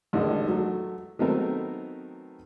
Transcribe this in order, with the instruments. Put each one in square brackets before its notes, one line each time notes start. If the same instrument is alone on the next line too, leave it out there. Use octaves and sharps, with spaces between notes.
[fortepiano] A1 E2 D3 D#3 G#3
F#3 A3
D#3 F#3 A3 B3 C4 A#4